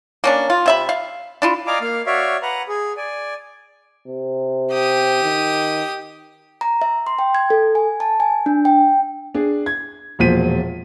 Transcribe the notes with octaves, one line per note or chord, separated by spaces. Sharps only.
A#3 C#4 D4
F4
C3 E5 B5
F5
D4 E4 F4
D5 D#5 F5 G#5 A#5 D6
A#3 F5
F#4 C#5 D5 E5 F5
B4 F#5 A#5
G#4
D5 G#5
C3
G4 D#6
D#3
A#5
E5
C6
G5
G#6
A4
G#5
A5
G#5
D4
G5
D4 G#4
G#6
E1 A#2 F3 B6 D#7